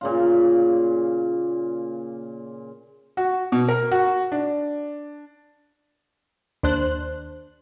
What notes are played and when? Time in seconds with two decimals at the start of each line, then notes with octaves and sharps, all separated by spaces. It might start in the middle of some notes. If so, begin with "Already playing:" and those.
0.01 A#2 C#3 F4
3.17 F#4
3.52 B2
3.68 A#4
3.91 F#4
4.32 D4
6.63 D#2 D4 C5 F#6